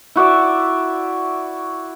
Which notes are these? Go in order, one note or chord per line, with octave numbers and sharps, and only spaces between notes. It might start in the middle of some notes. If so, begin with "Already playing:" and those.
E4 F#4 D5 E5